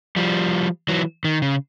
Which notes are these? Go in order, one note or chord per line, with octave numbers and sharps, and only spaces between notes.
F3 G3
E3 F#3
D#3
C#3